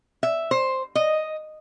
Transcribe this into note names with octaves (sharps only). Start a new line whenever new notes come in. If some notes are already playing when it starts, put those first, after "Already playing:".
E5
C5
D#5